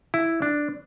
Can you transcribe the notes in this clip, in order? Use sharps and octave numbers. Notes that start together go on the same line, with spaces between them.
E4
D4